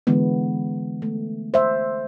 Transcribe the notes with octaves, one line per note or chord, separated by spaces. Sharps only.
D3 E3 G#3 B3
A3
C5 E5